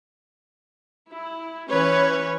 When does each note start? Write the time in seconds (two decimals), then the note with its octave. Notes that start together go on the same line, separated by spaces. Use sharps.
1.12 E4
1.70 E3 C#4 B4 C#5